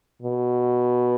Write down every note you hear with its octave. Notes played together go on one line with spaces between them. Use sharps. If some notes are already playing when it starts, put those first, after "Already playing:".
B2